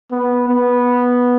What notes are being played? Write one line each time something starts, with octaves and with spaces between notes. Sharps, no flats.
B3
B3